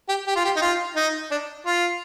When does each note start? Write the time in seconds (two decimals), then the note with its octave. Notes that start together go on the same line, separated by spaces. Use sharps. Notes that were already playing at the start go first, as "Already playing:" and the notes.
0.09 G4
0.27 G4
0.36 F4
0.44 G4
0.56 D#4
0.62 F4
0.96 D#4
1.31 D4
1.66 F4